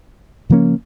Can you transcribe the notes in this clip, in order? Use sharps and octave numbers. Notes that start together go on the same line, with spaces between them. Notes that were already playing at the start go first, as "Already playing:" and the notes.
C#3 F3 A#3 C#4